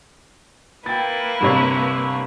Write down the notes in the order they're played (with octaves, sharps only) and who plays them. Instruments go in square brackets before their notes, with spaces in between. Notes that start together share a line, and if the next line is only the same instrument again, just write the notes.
[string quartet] A#3 E4 B4 [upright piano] G5 A6
[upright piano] G1 C3 C#5